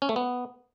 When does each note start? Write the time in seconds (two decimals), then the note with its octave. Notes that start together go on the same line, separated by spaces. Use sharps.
0.02 C#4
0.09 A3
0.16 B3